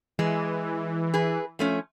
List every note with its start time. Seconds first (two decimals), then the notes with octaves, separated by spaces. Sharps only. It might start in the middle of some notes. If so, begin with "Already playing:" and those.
0.19 E3 G#3
1.14 G#4 B4
1.59 F3 A3 C#4